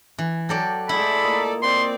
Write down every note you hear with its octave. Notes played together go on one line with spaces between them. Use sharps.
E3
F#3 G4 A4 D5
A2 G#3 E4 A4 D5 B5
A#2 D#5
C4 D5 C6